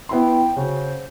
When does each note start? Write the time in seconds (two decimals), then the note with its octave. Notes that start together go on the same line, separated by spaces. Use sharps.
0.09 B3 E4 G5 C6
0.56 C#3 F#4 C5